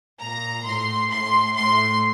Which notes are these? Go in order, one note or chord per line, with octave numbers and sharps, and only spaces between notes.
A#2 A#5
A2 C6
A2 C6
A2 C6